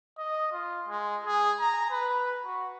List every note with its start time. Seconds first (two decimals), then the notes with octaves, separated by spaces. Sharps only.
0.18 D#5
0.52 F4
0.88 G#3
1.25 G#4
1.60 A#5
1.91 B4
2.45 F#4